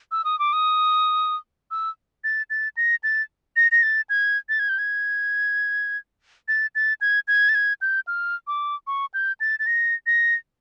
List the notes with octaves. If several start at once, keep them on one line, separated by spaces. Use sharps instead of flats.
E6
D#6
D6
D#6
E6
A6
A6
A#6
A6
A#6
A#6
A6
G#6
A6
G#6
G6
G#6
A6
A6
G#6
G#6
A6
G#6
G6
F6
D6
C#6
G6
A6
A6
A#6
A#6